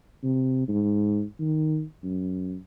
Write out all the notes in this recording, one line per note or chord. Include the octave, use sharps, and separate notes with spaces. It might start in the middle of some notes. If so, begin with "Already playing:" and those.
C3
G#2
D#3
F#2